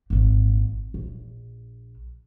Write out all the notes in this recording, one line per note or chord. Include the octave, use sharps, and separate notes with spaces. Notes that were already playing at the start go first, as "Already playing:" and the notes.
G#1 A#2
A#1